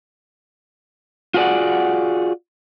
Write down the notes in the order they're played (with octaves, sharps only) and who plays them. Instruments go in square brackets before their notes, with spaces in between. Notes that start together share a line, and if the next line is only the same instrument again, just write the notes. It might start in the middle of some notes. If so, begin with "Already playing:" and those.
[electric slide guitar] F4 F#4 G#4 A4 D5 F#5